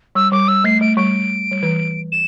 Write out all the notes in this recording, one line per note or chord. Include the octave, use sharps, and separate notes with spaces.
G3 E6
G3 D6
G3 E6
A3 C7
A3 D7
G3 D7
G3
E3
E7